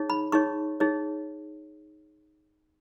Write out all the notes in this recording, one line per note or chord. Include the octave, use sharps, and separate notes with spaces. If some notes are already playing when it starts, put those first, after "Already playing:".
Already playing: D#4 G#4 C#5
B5
D#4 G#4 C#5 C#6
D#4 G#4 C#5